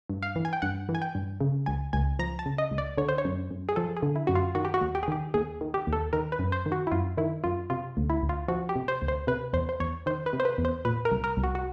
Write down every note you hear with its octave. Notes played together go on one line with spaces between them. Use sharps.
G2
F5
E3
G#5
G5
G2 F#5
E3
G#5
G5
G2
C#3
C#2 G#5
C#2 G#5
F3 A#5
A5
C#3
D#5
C#2
D5
D3 C#5
C5
C#5
F#2
F#2
G#4
F3 A4
G#4
D3
E4
F#2 F#4
F4
D#3 F#4
G4
F#4
D#2
G4
G#4
D#3 G4
D#2 G#4
D#3
G4
D#2
A4
D#3 A#4
B4
F#2
C5
D#3
F#4
E4
F#2 F4
D#3 E4
F#2 F4
C3 F4
D2
E4
D2
F4
F3 F#4
G4
C3
C5
D2
C5
C3 B4
E2 C5
C5
E2 C#5
D#3 C5
B4
C3
C5
B4
E2
C5
A#2 B4
A#4
C2
A#4
C2
F#4
F#4